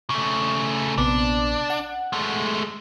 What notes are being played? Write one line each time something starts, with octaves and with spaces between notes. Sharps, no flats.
C#3 A3
A#1 C3 B3 D4
F#5
G#3 A3